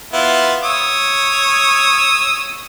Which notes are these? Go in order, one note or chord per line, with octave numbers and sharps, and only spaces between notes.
B3 E4 F4
C#5 D#6 E6